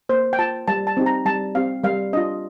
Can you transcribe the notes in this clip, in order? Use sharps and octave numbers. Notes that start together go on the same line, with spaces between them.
A#3 C5
G5
F4 A5
G3 A5
A5
C4 D#4 G4
A#5
G3 A5
C4 G4 F5
G3 F5
D4 F4 D#5